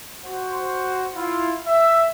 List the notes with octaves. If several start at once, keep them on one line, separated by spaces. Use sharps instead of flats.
F#4 C5
E4 F4
E5